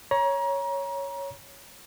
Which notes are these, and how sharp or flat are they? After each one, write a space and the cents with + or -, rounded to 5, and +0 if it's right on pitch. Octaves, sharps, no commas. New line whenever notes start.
C#5 +0 A#5 +30